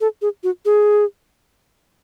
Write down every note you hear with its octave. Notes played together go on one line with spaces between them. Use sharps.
A4
G#4
F#4
G#4